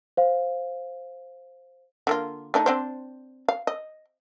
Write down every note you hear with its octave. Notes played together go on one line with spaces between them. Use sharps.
C5 F5
D3 A#3 F4
A3 D4 D#4
C4 D4 C5
F5
D#5